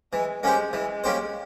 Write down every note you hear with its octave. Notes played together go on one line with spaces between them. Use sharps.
E3 G#3
G#3 A#3 C#4 G4 C5
E3 G#3
A#3 C#4 G4 C5